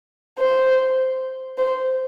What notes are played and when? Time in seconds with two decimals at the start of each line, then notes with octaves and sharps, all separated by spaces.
0.39 C5
1.58 C5